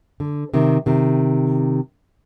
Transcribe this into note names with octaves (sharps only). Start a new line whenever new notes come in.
D3
C3 D#3
C3 D#3